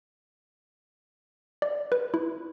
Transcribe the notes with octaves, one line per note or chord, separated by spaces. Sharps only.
D5
B4
E4